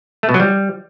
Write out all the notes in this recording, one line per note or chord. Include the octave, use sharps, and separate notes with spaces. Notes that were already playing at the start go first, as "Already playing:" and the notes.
A3
B2
F#3
G3